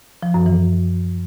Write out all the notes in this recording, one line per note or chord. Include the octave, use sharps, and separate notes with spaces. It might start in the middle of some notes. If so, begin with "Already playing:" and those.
F3
F#2
E3